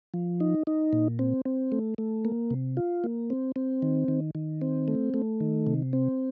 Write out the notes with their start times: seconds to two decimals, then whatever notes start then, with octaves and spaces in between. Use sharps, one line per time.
0.14 F3
0.40 D#4
0.67 D#4
0.93 A#2
1.19 C4
1.45 C4
1.72 A3
1.98 A3
2.25 A#3
2.51 C3
2.77 F4
3.04 A#3
3.30 C4
3.56 C4
3.82 D#3
4.08 D#3
4.35 D#3
4.62 C4
4.88 A3
5.14 A3
5.40 D#3
5.67 C3
5.93 C4